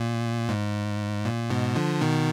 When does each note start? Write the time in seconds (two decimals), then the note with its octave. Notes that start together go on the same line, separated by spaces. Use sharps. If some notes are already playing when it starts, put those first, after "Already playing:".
Already playing: A#2
0.49 G#2
1.25 A#2
1.50 G#2 B2
1.75 D3 F3
2.01 B2 D#3